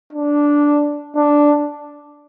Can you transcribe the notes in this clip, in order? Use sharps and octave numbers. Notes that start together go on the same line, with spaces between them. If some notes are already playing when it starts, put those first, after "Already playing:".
D4
D4